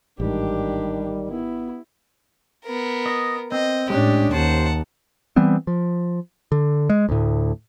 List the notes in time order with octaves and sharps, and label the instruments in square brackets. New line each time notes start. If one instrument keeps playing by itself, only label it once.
[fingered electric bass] A1 G#2 [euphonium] D#3 [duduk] G3 [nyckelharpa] D4 G4
[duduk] B3 [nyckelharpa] E4
[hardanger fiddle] B3 A#4
[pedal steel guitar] D#5
[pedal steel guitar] C4 [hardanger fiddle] D#5
[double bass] A2 C#4 [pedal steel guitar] G#3 D4 [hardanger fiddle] G4
[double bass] D#2 [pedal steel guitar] C5 [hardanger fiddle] F#5 A5
[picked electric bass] E3 G3 B3 C4
F3
D3
G#3
D2 A2